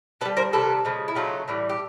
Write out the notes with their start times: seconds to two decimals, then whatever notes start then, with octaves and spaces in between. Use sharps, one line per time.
0.21 D3 A4 B4
0.25 G3
0.37 A#4 C5
0.53 C3 D#3 G3 A4 B4
0.85 C#3 F3 G#3
1.08 E4
1.15 C#3 F#3 A3 D#4 F4
1.48 A2 E3 G3
1.69 G4